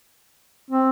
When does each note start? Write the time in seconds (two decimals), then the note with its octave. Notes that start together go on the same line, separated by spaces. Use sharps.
0.71 C4